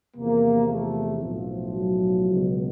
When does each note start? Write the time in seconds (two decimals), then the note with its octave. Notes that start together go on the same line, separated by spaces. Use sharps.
0.15 E2 C3 F3 A#3
0.69 A3
1.22 B1 A2 F3
1.75 F#3
2.29 C#2 B2